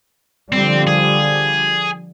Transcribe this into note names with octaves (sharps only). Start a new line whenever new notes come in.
D3 F3 G3 C4
G#4